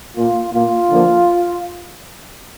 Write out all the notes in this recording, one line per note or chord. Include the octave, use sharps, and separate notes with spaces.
A#2 A#3 F4
A#2 A#3 F4
D3 F3 A#3